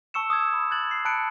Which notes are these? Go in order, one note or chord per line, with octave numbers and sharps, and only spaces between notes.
A5 C#6 E6 C#7 E7
D#6 E6 G#6
B5
F#6 G#6 A6 F#7
C7
A5 B5 F#6 C#7 D7